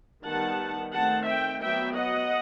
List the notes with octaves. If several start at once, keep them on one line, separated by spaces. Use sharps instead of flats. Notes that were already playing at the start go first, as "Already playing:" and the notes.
D#3 G3 B3 F#5 A5
D#3 A3 C4 F#5 A5
E5 G5
F#3 B3 E5 G5
D#5 F#5